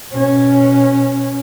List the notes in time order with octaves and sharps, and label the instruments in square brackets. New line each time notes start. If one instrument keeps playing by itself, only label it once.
[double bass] B2 C#4